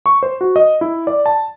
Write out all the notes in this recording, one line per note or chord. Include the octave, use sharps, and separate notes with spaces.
C#6
C5
F#4
D#5
E4
D5
A5